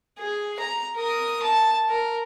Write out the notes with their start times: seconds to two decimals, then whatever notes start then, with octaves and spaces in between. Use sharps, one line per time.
0.19 G#4
0.59 A#5
0.96 A#4 D#6
1.43 A5
1.90 A#4